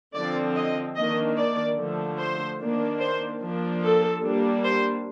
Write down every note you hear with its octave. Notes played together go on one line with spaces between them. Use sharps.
D3 F3 C4 D5
D#5
D#3 A#3 D4 D#5
D5
D3 F3 A3
C5
D#3 A#3 D4
C5
F3 A#3 D4
A4
G3 A#3 D4
C5